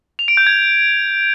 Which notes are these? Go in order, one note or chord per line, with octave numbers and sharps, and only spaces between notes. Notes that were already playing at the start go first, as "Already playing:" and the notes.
F7
D7
G6
G#6